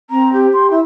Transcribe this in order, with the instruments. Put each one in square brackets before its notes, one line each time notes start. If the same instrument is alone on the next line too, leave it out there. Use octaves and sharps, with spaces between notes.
[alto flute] C4 [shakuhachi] A#5
[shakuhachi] G4
[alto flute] C6
E4